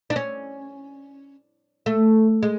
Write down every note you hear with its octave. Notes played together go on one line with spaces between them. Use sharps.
D4
C#4
A3
G#3